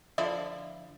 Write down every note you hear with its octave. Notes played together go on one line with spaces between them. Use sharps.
D3 F3 E4